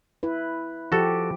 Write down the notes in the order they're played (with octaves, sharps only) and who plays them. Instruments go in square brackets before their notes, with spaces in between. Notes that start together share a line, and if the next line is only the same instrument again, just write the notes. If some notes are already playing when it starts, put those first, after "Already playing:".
[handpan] E4 B4
[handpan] F3 G4 [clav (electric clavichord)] F#4 A4